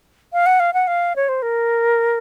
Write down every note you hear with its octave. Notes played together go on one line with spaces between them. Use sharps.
F5
F#5
F5
F#5
F5
C#5
C5
A#4